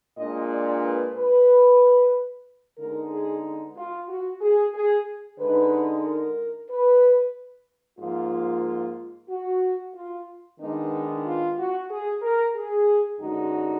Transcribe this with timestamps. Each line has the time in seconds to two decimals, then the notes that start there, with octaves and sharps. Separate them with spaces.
0.18 A#2 G#3 D4 D#5
0.52 D5
0.83 B4
1.16 B4
2.78 D3 G#3 B3 D#4 A#4
3.12 G#4
3.77 F4
4.09 F#4
4.41 G#4
4.75 G#4
5.39 D3 G#3 D#4 B4
6.04 A#4
6.70 B4
8.00 G#2 F3 A#3 F4
9.30 F#4
9.95 F4
10.60 D#3 G#3 B3 D4 D#4
11.25 F4
11.58 F#4
11.90 G#4
12.22 A#4
12.56 G#4
13.21 F#2 D3 G#3 D#4 F#4